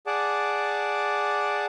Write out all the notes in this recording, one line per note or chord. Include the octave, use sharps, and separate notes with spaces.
G#4 D5 F#5 A5 D6